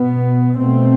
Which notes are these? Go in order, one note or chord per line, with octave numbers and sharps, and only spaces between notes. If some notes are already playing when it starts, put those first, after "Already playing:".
Already playing: B2 B3
B2 A3 C4